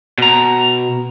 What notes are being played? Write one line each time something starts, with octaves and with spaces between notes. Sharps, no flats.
B2 A#5